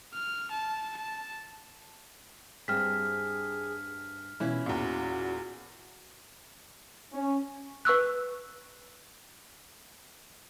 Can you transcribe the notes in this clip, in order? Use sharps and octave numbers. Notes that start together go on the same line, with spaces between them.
F6
A5
A5
G2 C4 G#4 F6 B6
B2 E3 C#4 E4 F4
E2 A#2 F#4
C#4
B4 C#6 E6 F#6